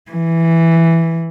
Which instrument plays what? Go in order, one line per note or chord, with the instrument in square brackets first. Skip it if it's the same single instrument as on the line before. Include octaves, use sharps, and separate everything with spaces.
[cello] E3